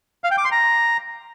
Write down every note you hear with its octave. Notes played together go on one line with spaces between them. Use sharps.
F5
G5
D6
C6
A#5